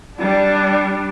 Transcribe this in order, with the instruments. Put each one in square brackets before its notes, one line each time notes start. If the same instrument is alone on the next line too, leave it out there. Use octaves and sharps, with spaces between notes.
[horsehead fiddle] G3 D4